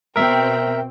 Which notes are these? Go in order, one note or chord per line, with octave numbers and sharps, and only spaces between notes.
B2 C4 A#4 E5 G5